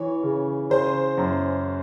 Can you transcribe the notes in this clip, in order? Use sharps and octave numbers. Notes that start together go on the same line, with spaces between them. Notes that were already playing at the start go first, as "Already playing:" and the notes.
Already playing: E3 C#5
C#3
C#3 C5
F#2